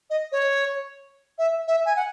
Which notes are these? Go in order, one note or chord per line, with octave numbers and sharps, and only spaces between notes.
D#5
C#5
E5
E5
G#5
F#5